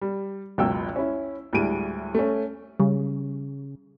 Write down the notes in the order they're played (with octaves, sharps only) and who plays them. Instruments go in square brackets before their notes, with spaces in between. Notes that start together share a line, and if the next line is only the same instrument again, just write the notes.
[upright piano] G3
F#1 C#2 B2 G5 E6
C#4 E4
D2 A2 G3 G#3 D7 D#7
A3 C#4
[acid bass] C#3 [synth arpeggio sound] G3